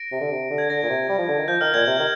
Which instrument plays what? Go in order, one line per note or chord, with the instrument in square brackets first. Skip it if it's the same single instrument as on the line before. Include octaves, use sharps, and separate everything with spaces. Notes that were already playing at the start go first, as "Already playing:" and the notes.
Already playing: [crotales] A#6 D7
[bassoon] C3
D3
C3
D3
[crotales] G#6
[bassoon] D3 [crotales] A#6
[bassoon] A#2
C3
G3
F3
D3
D#3
[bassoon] F3 [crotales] G6
[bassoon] D#3 [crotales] F6
[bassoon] A#2 [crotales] G#6
[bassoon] C3
D#3